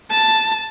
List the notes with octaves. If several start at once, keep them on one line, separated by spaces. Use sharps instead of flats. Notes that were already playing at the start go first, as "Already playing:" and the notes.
A5